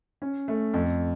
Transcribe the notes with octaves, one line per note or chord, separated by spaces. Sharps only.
C#4
A3
F2